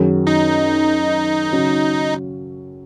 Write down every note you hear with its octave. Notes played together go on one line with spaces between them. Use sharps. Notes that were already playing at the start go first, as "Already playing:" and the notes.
Already playing: F#2 D#3 F#3 C#4 G#4
D#4
C#3 F#3 C#4